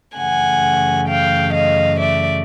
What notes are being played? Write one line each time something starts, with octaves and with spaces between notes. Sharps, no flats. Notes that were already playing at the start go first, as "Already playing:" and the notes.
F#2 C#3 E3 A3 F#5 G#5
F5 G5
D#5 F5
D5 E5